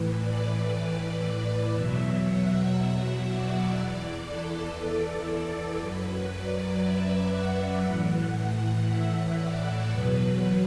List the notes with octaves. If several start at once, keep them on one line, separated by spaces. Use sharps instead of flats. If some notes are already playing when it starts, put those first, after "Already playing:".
Already playing: A2 E3 B4
D5
D5
E2 B2 F#3 E5
F#5
E5
D5
E2 E3
A4
A4
F#2 F#3 B4
D5
E5
F#5
A2 E3
F#5
E5
D5
E2 B2 F#3 B4